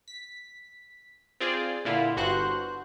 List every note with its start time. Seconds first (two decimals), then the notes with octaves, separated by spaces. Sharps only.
0.08 B6
1.40 C4 F4 G#4 D5
1.85 A#2 D3 E4 F4
2.16 G1 G2 F#4 C5 F#6